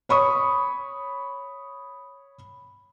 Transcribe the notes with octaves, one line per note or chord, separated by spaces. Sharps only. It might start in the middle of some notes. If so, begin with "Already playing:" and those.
C#5 B5 C#6 D#6